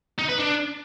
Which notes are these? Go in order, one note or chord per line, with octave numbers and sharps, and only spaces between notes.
D#4
B4
D4